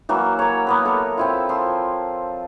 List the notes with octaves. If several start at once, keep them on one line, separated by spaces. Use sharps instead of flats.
E3 F#3 A#3
A#4 C#5
A#3 B3 B4
A4 A#4
C4 E4 F4
F3 C6